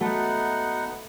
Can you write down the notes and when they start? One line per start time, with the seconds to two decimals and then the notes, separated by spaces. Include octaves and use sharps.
0.01 A3 B3 D#4 F#4 F#5 A5